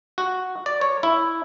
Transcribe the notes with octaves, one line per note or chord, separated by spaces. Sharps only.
F#4
D5
C#5
E4